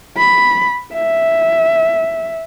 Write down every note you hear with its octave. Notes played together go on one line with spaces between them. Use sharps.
B5
E5